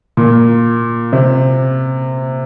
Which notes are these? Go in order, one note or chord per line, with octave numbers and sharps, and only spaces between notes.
A#2
C3